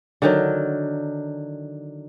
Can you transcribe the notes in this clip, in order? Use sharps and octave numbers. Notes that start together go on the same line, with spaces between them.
D3 D#3 F#3